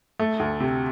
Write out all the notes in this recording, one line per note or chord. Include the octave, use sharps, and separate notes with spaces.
A3
D2
C3